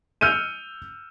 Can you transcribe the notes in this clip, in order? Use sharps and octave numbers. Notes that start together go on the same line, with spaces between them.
E6 F6 G6 C#7 D#7